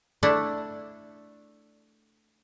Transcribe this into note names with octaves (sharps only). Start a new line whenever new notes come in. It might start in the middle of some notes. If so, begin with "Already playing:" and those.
A3 D4 E4